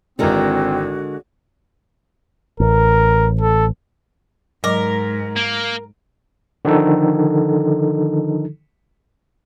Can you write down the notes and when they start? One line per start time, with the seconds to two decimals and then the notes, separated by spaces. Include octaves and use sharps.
0.19 G#1 D3 E3 G#3 C4 F#4 A#4
2.60 A1 A#4
3.41 A4
4.64 G#2 F#3 A#4 D#5 D6
5.36 A#3
6.65 D3 D#3 F3 D#4 A4